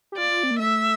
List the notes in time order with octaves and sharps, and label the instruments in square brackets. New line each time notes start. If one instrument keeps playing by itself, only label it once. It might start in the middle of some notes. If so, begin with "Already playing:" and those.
[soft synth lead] G4
[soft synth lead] F4 [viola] D5
[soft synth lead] C4
A#3
[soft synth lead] A3 [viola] E5